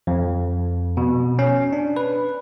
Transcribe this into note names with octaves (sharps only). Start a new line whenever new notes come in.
F2
B2
C#4
D4
B4